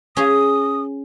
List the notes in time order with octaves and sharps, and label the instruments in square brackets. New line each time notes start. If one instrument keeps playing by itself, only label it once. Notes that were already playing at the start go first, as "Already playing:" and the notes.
[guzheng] C#4 G#4 [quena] D#6